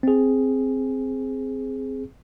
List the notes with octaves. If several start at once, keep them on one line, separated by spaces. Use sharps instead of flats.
C4 G#4